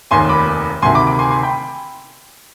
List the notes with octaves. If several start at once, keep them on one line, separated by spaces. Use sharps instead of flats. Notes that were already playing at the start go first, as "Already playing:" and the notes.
F1 D#2 D#3 G#5 C6
B5 D6
D2 C3 D#3 G#5 C6
B5 D6
B5 D6
G#5 C6
G#5 C6
G5 B5